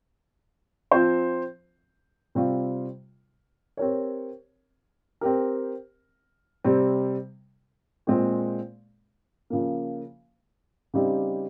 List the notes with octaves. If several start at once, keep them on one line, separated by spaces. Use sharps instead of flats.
F3 C4 F4 C5
C3 G3 C4 F4
C4 G4 A#4 C#5
C4 G4 A#4
C3 G3 C4
A#2 G#3 C4
C#3 F3 A#3
C#3 G3 C4 D#4 G4